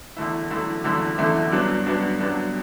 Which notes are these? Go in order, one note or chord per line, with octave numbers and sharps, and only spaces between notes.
E2 D3 A3 E4
E2 D3 A3 E4
E2 D3 A3 E4
E2 D3 A3 E4
G2 F#3 B3 D4
G2 F#3 B3 D4
G2 F#3 B3 D4